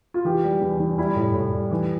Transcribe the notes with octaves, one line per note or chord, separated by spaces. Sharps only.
F4
E3 G4
G3
E2
E2
G3 E4
A2
A2
G3
E3